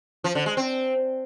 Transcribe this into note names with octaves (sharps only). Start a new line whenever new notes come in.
F3
D3
G#3
C4